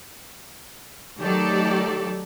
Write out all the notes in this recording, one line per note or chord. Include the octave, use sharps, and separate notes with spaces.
D#3 F#3 A3 G4 A4 D5